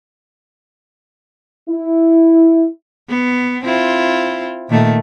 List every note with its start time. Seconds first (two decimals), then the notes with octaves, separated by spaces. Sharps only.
1.69 E4
3.09 B3
3.64 C4 E4 F4
4.69 A#2 D#3 A3